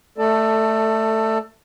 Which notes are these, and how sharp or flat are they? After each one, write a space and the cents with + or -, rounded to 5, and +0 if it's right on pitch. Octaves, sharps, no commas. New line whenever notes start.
A3 +0 A4 +15 D5 +25